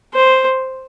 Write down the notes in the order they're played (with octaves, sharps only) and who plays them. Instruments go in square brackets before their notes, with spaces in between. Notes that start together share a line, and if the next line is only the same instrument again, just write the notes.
[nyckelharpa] C5